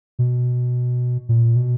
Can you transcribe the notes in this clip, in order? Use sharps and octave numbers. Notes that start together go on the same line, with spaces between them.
B2
A#2
B2